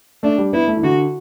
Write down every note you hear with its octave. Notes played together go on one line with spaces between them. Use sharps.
A3 D4
G3
B3 E4
A3
E3
D3 F#4